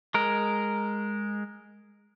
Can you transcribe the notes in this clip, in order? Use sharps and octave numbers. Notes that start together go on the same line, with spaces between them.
G#3 A#4